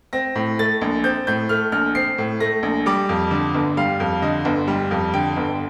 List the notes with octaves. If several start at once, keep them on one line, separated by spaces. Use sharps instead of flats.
C4 A#6
A2
A3 A6
A#1
C4 G6
A2 G6
A3 F6
A#1 F6
C4 C7
A2
A3 A#6
A#1
G3 D6
F2
D3
G1
G3 F5
F2
D3 D#5
G1
G3
F2
D3 G5
G1